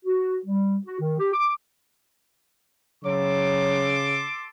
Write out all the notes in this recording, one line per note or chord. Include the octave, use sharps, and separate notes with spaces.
F#4
G3
F#4
D#3
G4
D6
C#3 F#3 A4 C6 D6